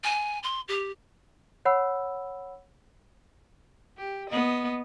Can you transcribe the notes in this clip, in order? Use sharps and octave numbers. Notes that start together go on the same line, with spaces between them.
G#5
C6
G4
C#5 F#5 B5 E6
G4
B3 D#5